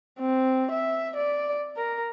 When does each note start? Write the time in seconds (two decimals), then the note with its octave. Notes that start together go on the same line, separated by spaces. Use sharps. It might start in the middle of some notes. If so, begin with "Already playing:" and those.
0.19 C4
0.71 E5
1.16 D5
1.77 A#4